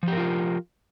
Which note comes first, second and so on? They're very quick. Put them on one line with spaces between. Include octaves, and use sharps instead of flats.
F3 G4 A#4 F4